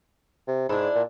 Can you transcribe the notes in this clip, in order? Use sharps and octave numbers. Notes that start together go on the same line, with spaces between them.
C3
G#2 D4 E4
A#2